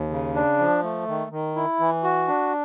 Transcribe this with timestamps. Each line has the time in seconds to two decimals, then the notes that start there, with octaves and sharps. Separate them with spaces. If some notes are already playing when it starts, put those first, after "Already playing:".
Already playing: D#2
0.10 C#3
0.35 D4
0.59 F3
0.83 A3
1.08 D#3
1.31 D#3
1.56 E4
1.80 E3
2.03 F#4
2.28 D4